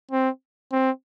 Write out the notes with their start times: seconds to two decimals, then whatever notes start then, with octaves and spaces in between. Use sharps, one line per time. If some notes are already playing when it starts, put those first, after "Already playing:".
0.11 C4
0.72 C4